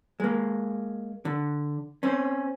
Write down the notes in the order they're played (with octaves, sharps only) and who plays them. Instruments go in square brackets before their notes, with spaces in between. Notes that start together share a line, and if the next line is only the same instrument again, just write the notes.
[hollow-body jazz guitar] G#3 A#3
D3
C4 C#4